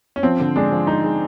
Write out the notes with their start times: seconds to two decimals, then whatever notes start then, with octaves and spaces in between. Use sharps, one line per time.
0.16 C#4
0.23 F3 C4
0.40 D3
0.56 G#3 D4
0.71 F3
0.87 G#3 D#4
1.04 G#3